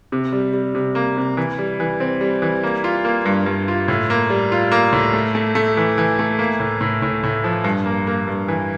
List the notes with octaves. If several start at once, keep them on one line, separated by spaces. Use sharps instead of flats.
C3
G3
G3
C3
A#3
C3
E3
G3
E3
C4
G3
E3
A#3
F4
A#3
G2
G2
F4
A2
A#3
G3
F4
A#3
A2
A3
A3
A3
E3
E3
A3
A#3
A2
A2
A2
A2
F3
G2
A#3
A#3
G2
E3